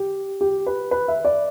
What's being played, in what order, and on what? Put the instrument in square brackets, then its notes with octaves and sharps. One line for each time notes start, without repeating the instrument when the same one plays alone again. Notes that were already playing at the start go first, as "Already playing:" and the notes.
Already playing: [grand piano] G4
G4
B4
B4
E5
D5